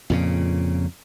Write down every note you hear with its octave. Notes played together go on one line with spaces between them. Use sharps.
F2 A#2 C#3